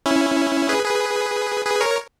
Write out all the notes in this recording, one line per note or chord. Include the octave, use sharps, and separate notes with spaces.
C#4 E4
G#4 B4
G#4 B4
G#4 B4
A#4 C#5